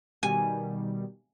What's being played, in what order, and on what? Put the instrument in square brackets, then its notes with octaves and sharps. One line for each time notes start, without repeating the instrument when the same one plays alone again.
[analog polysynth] B2 D#3 G3 [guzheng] G#5